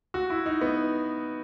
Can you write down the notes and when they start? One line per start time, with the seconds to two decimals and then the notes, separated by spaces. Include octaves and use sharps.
0.14 F#4
0.30 E4
0.46 D#4
0.61 B3